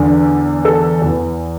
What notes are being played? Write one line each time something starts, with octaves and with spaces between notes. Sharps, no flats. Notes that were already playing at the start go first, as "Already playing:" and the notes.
Already playing: E2 D3
A4
E2 E3